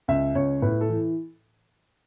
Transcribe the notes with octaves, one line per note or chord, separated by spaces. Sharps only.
C#2 E5
C#2 C#5
A2 B4
A4
E3